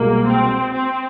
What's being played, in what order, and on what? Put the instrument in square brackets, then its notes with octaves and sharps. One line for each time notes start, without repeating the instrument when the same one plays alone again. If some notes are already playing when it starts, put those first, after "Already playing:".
Already playing: [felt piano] C2 B2 G#3 [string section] A#3
[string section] C4
C4